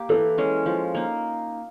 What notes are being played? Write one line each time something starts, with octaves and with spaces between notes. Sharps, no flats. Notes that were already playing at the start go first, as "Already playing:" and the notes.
Already playing: A#3 G4
E3 A4
G#3 C#4
F3
A#3 D#4